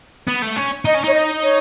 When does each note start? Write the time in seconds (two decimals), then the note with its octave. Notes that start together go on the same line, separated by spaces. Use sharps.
0.27 B3
0.42 A3
0.56 C#4
0.85 D#4 D#5
0.94 C#4
1.04 D#4 C#5
1.14 D#5
1.43 C#5